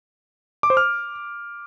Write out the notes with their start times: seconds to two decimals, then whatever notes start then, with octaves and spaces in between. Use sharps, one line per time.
0.63 D6
0.70 C5
0.77 F6